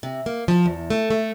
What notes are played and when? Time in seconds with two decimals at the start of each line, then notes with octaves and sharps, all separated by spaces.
0.03 C3
0.26 A#3
0.48 F3
0.66 E2
0.90 A3
1.10 A3